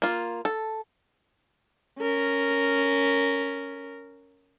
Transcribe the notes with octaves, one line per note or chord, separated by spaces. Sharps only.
A#3 F4
A4
C#4 A#4